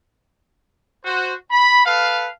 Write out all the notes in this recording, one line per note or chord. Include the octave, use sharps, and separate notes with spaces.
F#4 C5
B5
A4 B4 F5